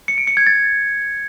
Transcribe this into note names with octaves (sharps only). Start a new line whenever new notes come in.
C#7
D7
C#7
G#6
A6